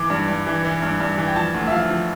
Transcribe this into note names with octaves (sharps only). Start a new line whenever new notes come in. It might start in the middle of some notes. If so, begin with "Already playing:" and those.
Already playing: E3 D6
G2
G2
E3
E3
G2
G2
E3
G5
F3 A5
D2
E5
F3 F5
F3